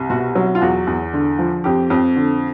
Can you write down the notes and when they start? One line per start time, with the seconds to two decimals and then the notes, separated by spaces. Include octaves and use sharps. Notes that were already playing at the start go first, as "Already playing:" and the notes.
Already playing: C2
0.10 B2 F#4
0.35 F#3
0.55 F4
0.61 E2 F#4
0.87 E2
1.13 D3
1.39 F3
1.64 F2 G4
1.90 F2
2.16 D3